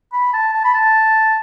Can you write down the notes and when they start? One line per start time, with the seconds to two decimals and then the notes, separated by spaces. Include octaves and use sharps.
0.13 B5
0.33 A5
0.54 A5
0.64 B5
0.74 A5